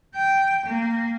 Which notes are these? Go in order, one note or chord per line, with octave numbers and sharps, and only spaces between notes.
G5
A#3